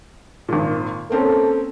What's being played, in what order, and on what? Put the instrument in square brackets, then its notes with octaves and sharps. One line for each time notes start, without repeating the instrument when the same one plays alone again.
[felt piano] G#1 A#2
[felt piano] A#3 C4 C#4 [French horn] A4